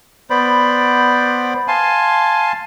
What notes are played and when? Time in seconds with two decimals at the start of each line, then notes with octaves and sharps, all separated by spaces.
0.30 B3 C5 D5 B5
1.68 F5 G#5 A5 C6